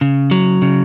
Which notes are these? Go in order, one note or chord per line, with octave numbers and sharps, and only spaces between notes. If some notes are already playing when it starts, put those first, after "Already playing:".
C#3
F#3
C#3